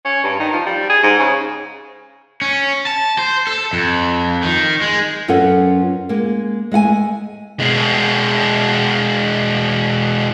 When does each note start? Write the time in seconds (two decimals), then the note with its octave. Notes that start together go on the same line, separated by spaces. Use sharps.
0.05 C#4
0.23 G2
0.39 D#3
0.53 F3
0.66 G3
0.89 G#4
1.03 G#2
1.19 C#3
2.41 C#4
2.87 A5
3.18 C5
3.47 A4
3.73 F2
4.43 D#3
4.81 G#3
5.28 F#2 C#4 F4 A4 B4 F#5
6.09 G#3 A#3
6.72 G#3 A3 F#5 G#5
7.60 B2 G#3